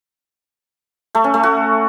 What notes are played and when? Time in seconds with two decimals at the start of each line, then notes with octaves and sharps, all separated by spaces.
1.15 A3
1.24 C#4
1.34 A3
1.43 F#4